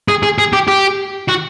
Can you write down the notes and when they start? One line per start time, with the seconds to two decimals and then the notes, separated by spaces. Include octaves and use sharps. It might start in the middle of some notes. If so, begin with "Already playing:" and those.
0.08 G#4
0.23 G#4
0.38 G#4
0.53 G4
0.68 G4
1.29 F#4